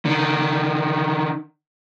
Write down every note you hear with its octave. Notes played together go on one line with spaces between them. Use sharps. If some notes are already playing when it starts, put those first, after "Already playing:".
D3 D#3